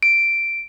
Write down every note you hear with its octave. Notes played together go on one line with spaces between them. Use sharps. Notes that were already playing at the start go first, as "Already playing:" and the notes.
D7